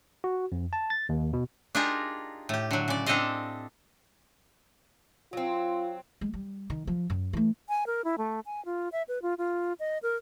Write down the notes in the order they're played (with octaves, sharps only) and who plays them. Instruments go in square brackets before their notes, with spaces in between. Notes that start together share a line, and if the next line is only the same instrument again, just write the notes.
[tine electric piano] F#4
F2
A5
A6
D#2
B2
[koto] D4 D#4 F4 G4 G#4 A#4
A2 G4
D3 F#3
C#3 D5
C4 D4 G4 A4 D#5 F5
[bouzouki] F#3 C4 [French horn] F4
[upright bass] G#3
G3
D#3
F3
F#2
E3 A3
[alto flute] G#5
A#4
E4
A3
G#5
F4
E5
B4
F4
F4
D#5
A#4